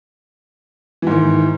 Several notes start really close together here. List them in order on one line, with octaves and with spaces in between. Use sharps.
E3 G#2 D#3